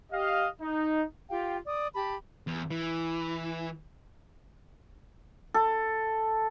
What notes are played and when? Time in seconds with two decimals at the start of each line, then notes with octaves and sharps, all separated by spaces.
0.12 G4 D#5 F5
0.61 D#4
1.30 F4 G4 F5 G5
1.66 D5 D#6
1.95 G4 A5 B5
2.47 E2
2.71 E3
5.54 A4